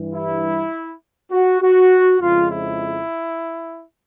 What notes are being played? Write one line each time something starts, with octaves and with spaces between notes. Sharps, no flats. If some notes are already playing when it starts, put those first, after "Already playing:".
Already playing: G2 E3 G3
E4
F#4
F#4
F2 C#3 F3 G#3 F4
E4